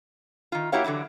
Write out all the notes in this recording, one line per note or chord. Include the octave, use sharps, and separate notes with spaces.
D#3 F4
A#3 E4 F#4 G4 C#5 F5
D3 E3 F#3 E4